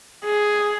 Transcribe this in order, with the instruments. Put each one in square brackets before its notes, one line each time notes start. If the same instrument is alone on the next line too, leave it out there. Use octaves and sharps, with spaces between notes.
[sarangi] G#4